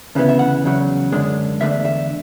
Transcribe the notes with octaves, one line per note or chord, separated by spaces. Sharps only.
D2 C#3 E3 B3
E5
F#5
E2 C#3 F#3
F#2 D3 G#3 D4
E2 D3 A3 D4 E5
E5